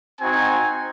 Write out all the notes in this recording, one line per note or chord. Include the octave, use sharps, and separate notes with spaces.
C4 D#4 F#4 G#5